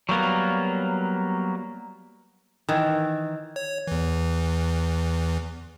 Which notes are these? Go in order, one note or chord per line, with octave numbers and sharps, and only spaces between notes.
F#3 G3 A#3 B3
D#3 E3
C#5
E2 E3